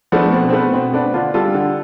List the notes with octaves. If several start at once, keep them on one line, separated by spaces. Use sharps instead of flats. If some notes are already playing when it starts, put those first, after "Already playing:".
F3 A3 B3 D4
B2 C4
C4
A3 B3
B2 C4
A3 B3 D4
D3 D4 F4
G3 F4 A4
D3